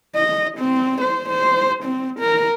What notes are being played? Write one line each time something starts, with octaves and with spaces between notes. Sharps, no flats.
D#5
C4
C5
C5
C4
A#4